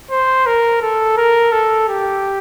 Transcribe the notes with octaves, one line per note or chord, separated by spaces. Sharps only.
C5
A#4
A4
A#4
A4
G4